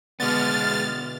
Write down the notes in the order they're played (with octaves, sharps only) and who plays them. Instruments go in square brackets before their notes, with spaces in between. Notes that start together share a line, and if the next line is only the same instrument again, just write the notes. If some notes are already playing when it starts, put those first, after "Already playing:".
[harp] B2 D3 [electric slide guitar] G#3 B3 [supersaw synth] F6 A6